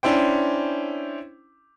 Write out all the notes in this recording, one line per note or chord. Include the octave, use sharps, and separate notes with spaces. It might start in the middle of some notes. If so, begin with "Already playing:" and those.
C#4 D4 E4 C5 G5